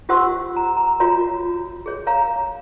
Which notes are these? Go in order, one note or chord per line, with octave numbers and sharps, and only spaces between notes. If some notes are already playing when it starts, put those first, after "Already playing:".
F4 G4 C5 F#5 C6 E6
A#5
A#5
F4 F#4 C#5 A#5
G#4 C#5
C#5 F5 A#5